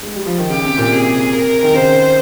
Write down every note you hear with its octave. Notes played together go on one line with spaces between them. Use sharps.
G#3
G3
F3
D#3
C#3 G4
C3
A#2
C3 G#4
A#4
D#3
C#3 C5